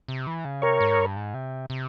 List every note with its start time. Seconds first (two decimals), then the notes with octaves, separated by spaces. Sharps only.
0.08 C3
0.27 E3
0.45 C#3
0.62 C3 A#4 C#5
0.80 G#2
0.98 G2
1.16 G#2
1.34 C3
1.70 C3